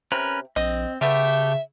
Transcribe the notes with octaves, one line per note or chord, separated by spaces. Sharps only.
C3 C#4 A#4 B4
A#1 C4 D#5
C#3 G3 A3 B3 G4 E5